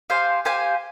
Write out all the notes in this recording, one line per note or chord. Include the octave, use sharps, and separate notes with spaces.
G4 C5 F5 G#5
G4 C5 F5 G#5